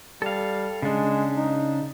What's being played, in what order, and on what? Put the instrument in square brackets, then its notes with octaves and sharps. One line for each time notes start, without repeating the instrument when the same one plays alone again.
[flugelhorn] G3 [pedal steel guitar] A4 F5
[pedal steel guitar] C#3 D4 [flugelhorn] G#3
[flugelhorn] D#4